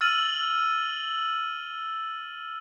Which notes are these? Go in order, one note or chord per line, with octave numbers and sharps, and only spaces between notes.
E6 F6 A6 D#7 F#7